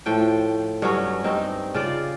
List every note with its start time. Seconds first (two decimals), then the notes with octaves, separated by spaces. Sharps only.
0.06 A2 F3 G5
0.82 G2 F#3 C#4
1.24 G2 C4 D#4
1.74 C#3 F4 D5